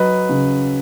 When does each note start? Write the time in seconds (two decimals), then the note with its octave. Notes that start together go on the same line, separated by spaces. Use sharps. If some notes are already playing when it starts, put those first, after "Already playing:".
Already playing: F#3 B4 D#5
0.29 C#3